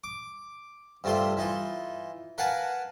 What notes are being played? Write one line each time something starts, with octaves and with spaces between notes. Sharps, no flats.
D6
G2 C3 A3 F4 C6
E3 D#4 F4
A#4 B4 F5 F#5 G#5 A5